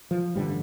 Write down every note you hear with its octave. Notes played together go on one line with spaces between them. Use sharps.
F3
A1 G2 D3 G3